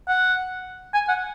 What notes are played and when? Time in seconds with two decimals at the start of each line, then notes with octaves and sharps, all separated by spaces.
0.08 F#5
0.94 G#5
1.08 F#5